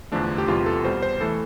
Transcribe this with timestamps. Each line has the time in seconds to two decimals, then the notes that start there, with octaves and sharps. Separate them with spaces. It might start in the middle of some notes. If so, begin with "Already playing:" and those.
0.12 E2 D3 F3 A3 D4
0.38 G4
0.48 E2 C3 G3 F4
0.66 A4
0.84 B2 G3 C5
1.03 C5
1.21 E3 A3 A4